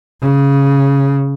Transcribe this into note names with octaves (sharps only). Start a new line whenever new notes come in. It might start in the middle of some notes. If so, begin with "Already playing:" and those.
C#3